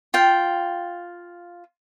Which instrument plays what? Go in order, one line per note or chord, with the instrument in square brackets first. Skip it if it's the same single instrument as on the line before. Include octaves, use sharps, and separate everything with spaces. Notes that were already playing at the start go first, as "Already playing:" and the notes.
[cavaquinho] F4 G5